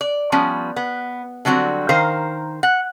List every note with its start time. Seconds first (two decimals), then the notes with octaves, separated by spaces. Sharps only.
0.01 D5
0.32 F3 G3 B3 C#4
0.76 B3
1.45 D3 F#3 G3 C4 F#4
1.89 D#3 A#4 C5 F5
2.63 F#5